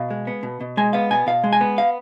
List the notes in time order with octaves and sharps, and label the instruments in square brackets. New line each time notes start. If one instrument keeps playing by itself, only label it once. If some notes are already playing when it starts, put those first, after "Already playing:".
Already playing: [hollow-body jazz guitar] B2 F5
G#3
B3
B2
B2
G#3 G#5
B3 F5
B2 G#5
B2 F5
G#3
G#5
B3
F5